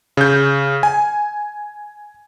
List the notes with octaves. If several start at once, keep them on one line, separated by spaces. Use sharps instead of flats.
C#3 G6
G#5